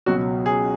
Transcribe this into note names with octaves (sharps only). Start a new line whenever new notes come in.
C#2 B2 F#3 F#4
G#4